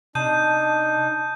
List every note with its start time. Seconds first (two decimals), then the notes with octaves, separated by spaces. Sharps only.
0.15 C3 D4 D#4 A5 D#6 G6 D#7